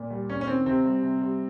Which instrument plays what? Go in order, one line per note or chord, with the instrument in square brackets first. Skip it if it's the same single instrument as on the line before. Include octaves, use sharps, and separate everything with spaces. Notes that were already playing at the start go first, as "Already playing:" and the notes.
Already playing: [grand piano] A#2
G3
A#2 C#4
C#4
D#3 C4
C3 C4
G3
C3
G3